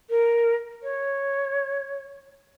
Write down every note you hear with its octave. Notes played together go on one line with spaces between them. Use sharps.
A#4
C#5